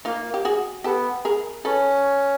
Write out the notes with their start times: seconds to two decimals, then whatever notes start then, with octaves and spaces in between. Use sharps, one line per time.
0.05 A#3 D#4 F4
0.34 G4
0.45 F#4 G#4
0.84 B3 G4 A4
1.25 G#4 A#4
1.65 C#4 A4 B4